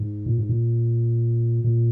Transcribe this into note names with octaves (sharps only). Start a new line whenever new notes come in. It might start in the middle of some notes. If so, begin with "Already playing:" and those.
Already playing: G#2
A#2
G#2
A#2
A#2